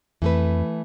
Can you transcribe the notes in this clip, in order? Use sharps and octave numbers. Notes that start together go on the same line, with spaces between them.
F2 E3 A3 B4